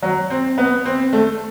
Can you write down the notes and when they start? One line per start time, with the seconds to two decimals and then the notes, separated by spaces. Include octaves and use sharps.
0.02 F#3
0.30 C4
0.58 B3
0.85 C4
1.13 A3